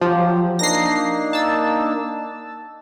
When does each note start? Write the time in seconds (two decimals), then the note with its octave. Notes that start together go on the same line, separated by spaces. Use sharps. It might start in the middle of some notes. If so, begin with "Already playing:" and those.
0.01 F3 F#3 G4 C5
0.59 A#3 D4 D#4 A#6 C7
1.33 A5 E6